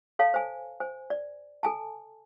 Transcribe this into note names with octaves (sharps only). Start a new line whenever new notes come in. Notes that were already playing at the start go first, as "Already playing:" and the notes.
A4 C#5 F5 A5
C5 G#5
C5 G#5
D5
A4 G#5 A5